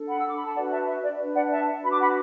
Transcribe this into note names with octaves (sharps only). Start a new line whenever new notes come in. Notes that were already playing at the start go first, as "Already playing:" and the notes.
Already playing: D4 A4
F#5 B5
E6
D6
B5
A5
D4 F#4 B4 D5 F#5
E5 A5
E5
D5
D4 B4
D5 F#5
E5 A5
D4 F#4 B4 B5
D6
F#5 B5